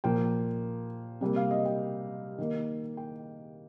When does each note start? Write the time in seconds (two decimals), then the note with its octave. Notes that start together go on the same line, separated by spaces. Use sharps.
0.04 A#2 F3 A#3 G5
1.21 C3 G3 A#3
1.36 F5
1.51 D#5
1.65 G5
2.39 D#3 A#3
2.97 G5